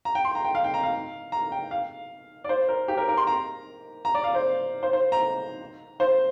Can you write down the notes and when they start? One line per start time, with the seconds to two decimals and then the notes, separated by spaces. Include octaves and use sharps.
0.05 A#5
0.15 G5
0.25 C6
0.35 A#5
0.45 G5
0.55 F5
0.64 G5
0.74 A#5
0.83 F5
1.32 A#5
1.52 G5
1.71 F5
2.44 D5
2.49 C5
2.69 A#4
2.88 G4
2.98 A#4
3.08 A#4
3.17 C6
3.27 A#5
4.05 A#5
4.14 D5
4.24 F5
4.35 C5
4.83 C5
4.93 C5
5.12 A#5
6.00 C5